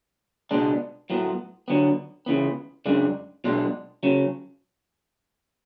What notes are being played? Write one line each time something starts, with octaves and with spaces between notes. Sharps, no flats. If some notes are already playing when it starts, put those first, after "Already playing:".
C#2 B2 G#3 B3 D4
A2 F#3 B3
D3 F#3 B3
C#2 C#3 E3 B3
F#2 C#3 G#3 D4
B1 B2 G#3 D4
C#3 F#3